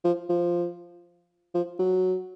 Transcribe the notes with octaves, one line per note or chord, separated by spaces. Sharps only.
F3
F3
F3
F#3